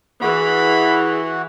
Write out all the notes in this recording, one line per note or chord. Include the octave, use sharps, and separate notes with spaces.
E3 F#4 G#4 F#5 B5